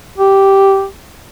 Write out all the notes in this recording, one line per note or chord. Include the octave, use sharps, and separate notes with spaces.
G4